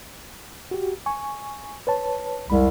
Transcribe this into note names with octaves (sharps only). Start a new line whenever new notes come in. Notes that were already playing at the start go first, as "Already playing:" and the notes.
F#4 G4
G#5 C#6
B4 C#5 A5
C2 F2 G#3 B5